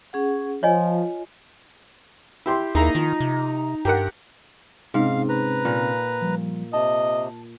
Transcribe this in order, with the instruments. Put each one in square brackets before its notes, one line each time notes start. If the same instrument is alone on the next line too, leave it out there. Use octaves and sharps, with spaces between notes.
[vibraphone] C#4 G#4 F#5
[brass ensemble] F3 [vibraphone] F4 [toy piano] C#5 D#5 G#5
[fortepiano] E4 G4 C6
[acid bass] D#2 [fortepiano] A#3 E4 G#4 [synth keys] D#4 A#5
[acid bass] D#3 [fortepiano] F3
[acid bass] C3
[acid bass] G2 [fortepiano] G4 A#4 F#5
[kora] G#2 [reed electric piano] C3 C4 C#4 [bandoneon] F5
[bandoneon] B4 A#5
[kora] A#2
[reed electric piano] F3 G3
[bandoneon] C3 [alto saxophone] D#5 [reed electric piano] A5